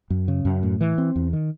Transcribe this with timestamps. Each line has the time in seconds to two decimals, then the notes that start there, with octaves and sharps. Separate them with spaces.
0.10 F#2
0.28 C#3
0.45 F#2
0.63 A2
0.81 E3
0.98 C4
1.16 E2
1.33 D#3